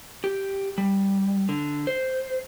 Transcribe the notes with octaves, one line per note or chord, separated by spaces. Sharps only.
G4
G3
D3
C5